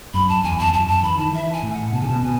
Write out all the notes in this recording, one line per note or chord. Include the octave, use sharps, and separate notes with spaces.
F#2 B5
A5
E2 G#5
A5
E2
F#2 A5
F#2 A5
E3 B5
D#3 A5
E3 E5
G#5
A2
F#5
B2 A5
C#3 G#5
B2 A5
B2 G#5